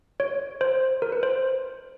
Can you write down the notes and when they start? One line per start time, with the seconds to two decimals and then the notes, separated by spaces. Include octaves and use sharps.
0.20 C#5
0.61 C5
1.02 A#4
1.12 B4
1.23 C5